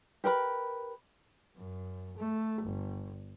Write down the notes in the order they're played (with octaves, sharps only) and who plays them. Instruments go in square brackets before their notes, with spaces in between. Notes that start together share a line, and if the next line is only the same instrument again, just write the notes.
[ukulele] G4 A#4 B4 B5
[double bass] F#2
A3
G1